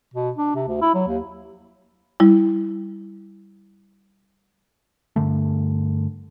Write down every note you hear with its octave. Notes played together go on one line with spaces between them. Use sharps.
B2
D4
C3
D2
E4
F#3
D#2
G3 E4
G2 D3 A3